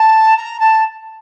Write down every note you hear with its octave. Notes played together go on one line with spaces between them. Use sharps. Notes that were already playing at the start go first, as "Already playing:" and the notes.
Already playing: A5
A#5
A5